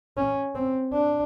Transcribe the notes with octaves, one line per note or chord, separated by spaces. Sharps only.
C#4
C4
D4